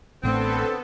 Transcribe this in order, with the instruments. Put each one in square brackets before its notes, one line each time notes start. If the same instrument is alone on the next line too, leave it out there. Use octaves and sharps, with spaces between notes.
[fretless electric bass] A1 A2 A3 [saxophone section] D3 C4 [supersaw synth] B3 A4